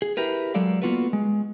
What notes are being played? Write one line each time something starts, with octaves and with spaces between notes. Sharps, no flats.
G#4
E4 G4 A#4 B4
F#3 G#3 A4 D5 F5
A#3 B3 F4 F#4 A4 B4
G#3